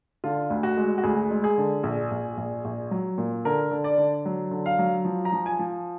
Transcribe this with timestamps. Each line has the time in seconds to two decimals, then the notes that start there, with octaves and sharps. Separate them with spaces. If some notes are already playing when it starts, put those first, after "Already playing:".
0.24 D3 F4
0.50 D2
0.63 F#4
0.77 G#3
0.98 F#4
1.03 D2 G#4
1.31 G#3
1.44 G#4
1.58 D3
1.83 A#1
2.11 A#1
2.37 A#1
2.64 A#1
2.91 F#3
3.18 A#2
3.45 D3 A#4
3.71 D3
3.84 D5
3.98 D3
4.25 F#3
4.51 D3
4.66 F5
4.79 F#3
5.05 F3
5.25 A#5
5.32 F3
5.46 G#5
5.59 F3